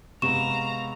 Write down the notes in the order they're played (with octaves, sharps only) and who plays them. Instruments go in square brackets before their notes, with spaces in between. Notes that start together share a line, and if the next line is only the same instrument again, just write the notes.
[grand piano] C3 G#3 B3 [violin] F5 A#5 [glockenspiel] C#6 [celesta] E7